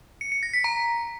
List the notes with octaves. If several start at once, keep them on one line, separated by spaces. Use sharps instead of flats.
C#7
C#7
A#6
B6
A#5